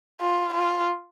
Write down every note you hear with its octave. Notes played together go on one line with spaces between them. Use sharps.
F4
F4